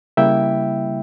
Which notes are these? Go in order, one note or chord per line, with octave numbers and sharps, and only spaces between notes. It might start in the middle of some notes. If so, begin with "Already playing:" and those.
C#3 G3 A#3 E4 E5 G5